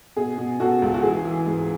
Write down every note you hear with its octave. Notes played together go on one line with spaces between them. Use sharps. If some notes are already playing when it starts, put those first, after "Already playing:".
B2 G#4
B2
B2 F#4 A4
C#2
F#4
E3 G#4
E3
G#2